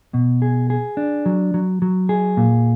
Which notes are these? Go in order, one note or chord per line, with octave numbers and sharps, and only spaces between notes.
B2
G#4
G#4
D4
F#3
F#3
F#3
G#4
A#2